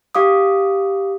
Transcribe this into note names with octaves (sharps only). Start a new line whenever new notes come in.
G4 F5 D6 D#6